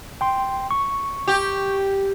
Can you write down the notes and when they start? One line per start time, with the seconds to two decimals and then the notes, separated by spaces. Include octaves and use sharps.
0.21 G5 C6
0.71 C#6
1.28 G4